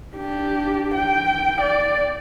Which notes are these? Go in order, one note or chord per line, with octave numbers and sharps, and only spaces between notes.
D4 G4
G5
D5